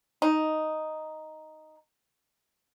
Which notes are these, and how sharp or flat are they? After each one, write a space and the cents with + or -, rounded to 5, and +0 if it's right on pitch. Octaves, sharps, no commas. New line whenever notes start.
D#4 +0